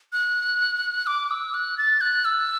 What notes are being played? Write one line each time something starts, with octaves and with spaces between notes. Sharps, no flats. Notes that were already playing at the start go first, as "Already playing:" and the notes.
F#6
D6
E6
F#6
A6
F#6
E6